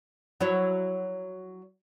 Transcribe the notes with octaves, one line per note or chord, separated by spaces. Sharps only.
F#3 E4 C#5